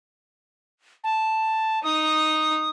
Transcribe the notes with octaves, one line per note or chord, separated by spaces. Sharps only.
A5
D#4 D#6